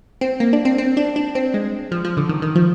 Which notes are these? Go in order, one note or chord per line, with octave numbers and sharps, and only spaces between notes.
C4
A#3
D4
C4
C4
D4
D4
C4
G#3
F3
F3
D3
D#3
D#3
F3